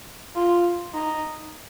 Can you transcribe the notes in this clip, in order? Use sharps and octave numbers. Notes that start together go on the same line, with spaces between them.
F4
D#4